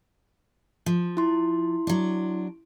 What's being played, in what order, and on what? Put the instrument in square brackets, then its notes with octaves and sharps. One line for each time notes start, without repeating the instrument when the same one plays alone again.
[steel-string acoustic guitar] F3
[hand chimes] E4 C6
[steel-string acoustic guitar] F#3 D4